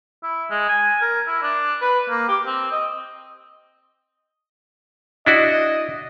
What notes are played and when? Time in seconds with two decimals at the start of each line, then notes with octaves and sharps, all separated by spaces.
0.23 E4
0.50 G#3
0.69 G#5
1.01 A#4
1.27 E4
1.42 D4
1.81 B4
2.09 A#3
2.28 G4
2.46 C4
2.72 D#5
5.26 D4 E4 F#4 D#5